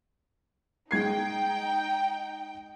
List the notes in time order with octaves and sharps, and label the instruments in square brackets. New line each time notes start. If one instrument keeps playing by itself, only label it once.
[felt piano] G#3 G#6 C7 [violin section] D#4 G5